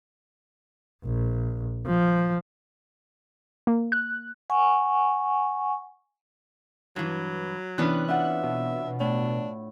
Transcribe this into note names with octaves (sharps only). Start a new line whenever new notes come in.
A#1
F3
A#3
F#6
F#5 G#5 C#6
G2 E3 F#3
C3 E3 B3 C#4 D4 F#6
D4 F4 E5 F#5
B2
A2 D4